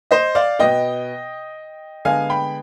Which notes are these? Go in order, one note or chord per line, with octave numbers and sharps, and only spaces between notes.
C5 D#5
D5 F5
B2 B3 D#5 G5
D3 G#3 B3 F5 G#5
G5 B5